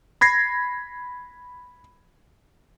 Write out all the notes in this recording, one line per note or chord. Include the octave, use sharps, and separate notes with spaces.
B5 G#6 A#6 C7